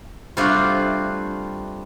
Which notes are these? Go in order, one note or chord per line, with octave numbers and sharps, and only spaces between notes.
C3 G3 A3 D4 F4 F#4